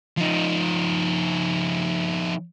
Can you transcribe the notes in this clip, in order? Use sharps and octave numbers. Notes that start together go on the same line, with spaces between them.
F3 D#4